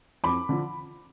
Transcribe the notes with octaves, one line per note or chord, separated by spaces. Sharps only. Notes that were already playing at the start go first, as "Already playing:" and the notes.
F2 B5 D6
D3 F3